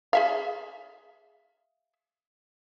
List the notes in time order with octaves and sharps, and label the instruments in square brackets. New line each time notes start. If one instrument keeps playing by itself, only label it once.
[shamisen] G#4 E5 F5